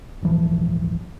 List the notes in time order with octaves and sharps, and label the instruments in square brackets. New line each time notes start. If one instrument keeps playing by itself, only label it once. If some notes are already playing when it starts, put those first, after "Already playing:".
[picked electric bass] D#1 G#1 E3 F3